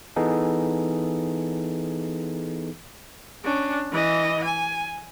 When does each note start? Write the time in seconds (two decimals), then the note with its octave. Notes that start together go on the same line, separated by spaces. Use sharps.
0.16 E3 B3 D#4 G#4 A4
3.44 C#4 D4
3.92 E3 D#5
4.44 G#5